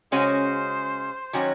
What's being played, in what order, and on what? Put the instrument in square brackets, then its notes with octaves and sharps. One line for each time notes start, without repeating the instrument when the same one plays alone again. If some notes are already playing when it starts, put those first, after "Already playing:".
[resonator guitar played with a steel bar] C#3 G#3 C#4 F#4 [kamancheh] C5
[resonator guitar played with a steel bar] D#3 F#3 C#4 F#4